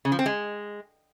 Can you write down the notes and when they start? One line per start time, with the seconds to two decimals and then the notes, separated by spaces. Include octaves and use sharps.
0.05 C#3
0.12 F3
0.19 C4
0.26 G#3